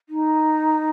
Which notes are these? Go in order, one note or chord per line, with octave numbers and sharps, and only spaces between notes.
D#4